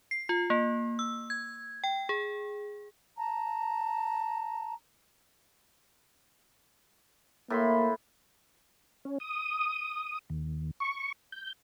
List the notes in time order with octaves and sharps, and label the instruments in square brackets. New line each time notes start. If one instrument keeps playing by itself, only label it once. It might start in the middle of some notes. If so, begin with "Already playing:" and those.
[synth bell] C7
F4
A#3
E6
G#6
G5
G#4
[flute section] A5 A#5
[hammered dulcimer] A2 B5 C6 [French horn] A#3
[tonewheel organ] C#4
D#6
D#2
C#6
G6